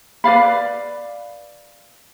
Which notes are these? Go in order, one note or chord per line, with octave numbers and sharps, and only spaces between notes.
B4 D5 F5 B5